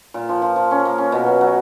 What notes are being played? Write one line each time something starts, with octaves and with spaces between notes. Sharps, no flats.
A#2
F3
F3
F3
C#4
A#3
C#4
B2
F#3
F#3